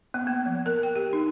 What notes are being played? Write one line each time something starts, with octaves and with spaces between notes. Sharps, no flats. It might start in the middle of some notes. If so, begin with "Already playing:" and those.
B3
A#3
F3
A#4
G5
G4
D#4